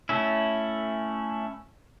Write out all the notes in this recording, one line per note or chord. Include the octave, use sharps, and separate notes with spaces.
A3 C#4 E4